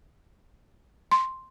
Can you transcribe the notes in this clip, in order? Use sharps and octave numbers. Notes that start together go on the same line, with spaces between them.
C6